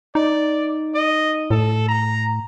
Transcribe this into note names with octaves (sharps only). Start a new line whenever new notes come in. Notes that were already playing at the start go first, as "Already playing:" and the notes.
D#4 D5
D#5
A2 A4
A#5